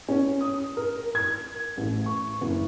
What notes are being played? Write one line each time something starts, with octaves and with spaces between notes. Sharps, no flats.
C#4
D#6
A#4
G#6
A1
C#6
F#1